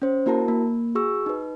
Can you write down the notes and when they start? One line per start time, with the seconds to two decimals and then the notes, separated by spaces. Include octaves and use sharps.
0.02 C#4 C5
0.26 A#3 E4 F#4 A#4 A5 A#5
0.48 A#3
0.95 F#4 G#4 C#6 E6
1.26 D#4 B4